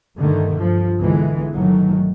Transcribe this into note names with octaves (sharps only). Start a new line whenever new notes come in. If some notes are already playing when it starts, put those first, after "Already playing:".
G2 D3 D#3 A3
G2 F3
B1 B2 D3 E3 G#3 B3
G1 D#3 E3 F#3 A3